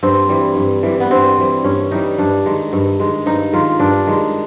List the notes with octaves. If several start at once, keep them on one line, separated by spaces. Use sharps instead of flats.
G2 C4
E3 G3
G2
E3 G3
B3
G2 C4
E3 G3
G2 C#4
E3 G3 D#4
G2 D4
D#3 G#3
G2
D#3 G#3
G2 D#4
D#3 G#3 F4
G2 D4
D#3 G#3